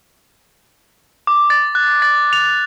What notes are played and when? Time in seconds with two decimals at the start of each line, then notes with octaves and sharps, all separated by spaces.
1.27 D6
1.50 A6
1.75 F#6
2.02 A6
2.33 F7